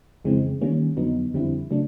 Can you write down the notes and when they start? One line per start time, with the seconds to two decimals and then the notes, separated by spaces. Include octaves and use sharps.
0.25 F2 C#3 E3 G#3 C4
0.61 D#3 G3 A#3 C#4
0.97 F2 D3 F#3 B3 D#4
1.34 F2 D3 G3 C4 E4
1.70 C#3 F#3 A3 D4